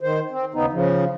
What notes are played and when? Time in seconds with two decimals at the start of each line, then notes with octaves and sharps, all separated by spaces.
0.01 D#3 C5
0.31 C4
0.54 D#2 C#3 B3 D#4
0.73 C#3 F3